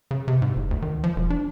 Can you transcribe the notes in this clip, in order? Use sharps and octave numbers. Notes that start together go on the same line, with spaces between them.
C#3
C3
G#2
F#1
D2
D#3
F3
E1
D4